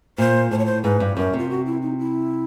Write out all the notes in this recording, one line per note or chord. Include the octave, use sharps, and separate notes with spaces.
A#2 C5
A2 C5
C#5
C5
G#2 B4
G2
F#2 A#4
C3 F4
F#4
E4
D#4
E4